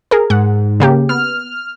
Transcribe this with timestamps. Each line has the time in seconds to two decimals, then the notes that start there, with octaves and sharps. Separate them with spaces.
0.11 G#4 A#4
0.30 G#2 F#5
0.80 C#3 A#3 G4
1.09 B3 F6